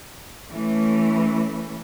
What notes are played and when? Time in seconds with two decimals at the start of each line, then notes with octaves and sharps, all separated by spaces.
0.50 E3 A3 C#4